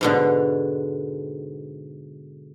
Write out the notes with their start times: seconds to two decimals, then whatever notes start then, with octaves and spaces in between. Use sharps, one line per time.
0.01 G#2 B2 D3